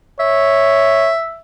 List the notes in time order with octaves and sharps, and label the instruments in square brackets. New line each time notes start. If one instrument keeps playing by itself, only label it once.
[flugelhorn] C#5 [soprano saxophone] E5